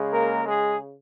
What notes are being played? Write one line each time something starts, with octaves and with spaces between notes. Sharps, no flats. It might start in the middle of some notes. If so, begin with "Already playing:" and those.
Already playing: C#3 G#3
A#3 A#4
G#3 G#4